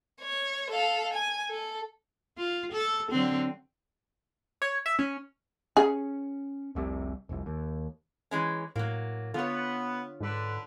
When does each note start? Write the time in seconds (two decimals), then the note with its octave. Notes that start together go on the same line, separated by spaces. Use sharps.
0.21 C#5
0.70 A4 F5
1.13 G#5
1.50 A4
2.38 F4
2.72 A4
3.11 D3 F#3 C4
4.62 C#5
4.86 E5
4.99 C#4
5.77 C#4 G#4
6.75 F1 C2 C3
7.29 F1 C2
7.46 D#2
8.31 E3 G#3 C#4
8.76 A2 F#3 A#3
9.34 D3 B3 F4 C#5
10.20 G#2 D3 B4